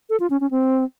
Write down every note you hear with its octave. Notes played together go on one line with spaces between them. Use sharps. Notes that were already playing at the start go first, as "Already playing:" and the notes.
A4
F4
C#4
C#4
C4